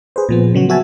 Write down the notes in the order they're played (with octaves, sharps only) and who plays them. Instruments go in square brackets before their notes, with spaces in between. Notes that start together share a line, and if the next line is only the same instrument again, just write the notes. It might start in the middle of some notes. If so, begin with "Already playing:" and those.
[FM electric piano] G#4 B4 C5
A#2 F3 B3
C#3 F#3 F#4
B3 F#4 E5 G#5 A5